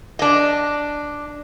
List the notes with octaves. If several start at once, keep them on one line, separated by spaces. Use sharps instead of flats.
D4 D#5